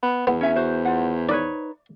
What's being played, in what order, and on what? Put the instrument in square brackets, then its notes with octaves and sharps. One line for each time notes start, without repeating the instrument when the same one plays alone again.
[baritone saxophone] B3
[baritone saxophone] E2 [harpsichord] B3
[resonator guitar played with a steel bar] C#4 E5 G#5
[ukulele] F#4 [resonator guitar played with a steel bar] C5
[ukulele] F4 F#5
[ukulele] D#4 B4 C#5 [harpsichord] D5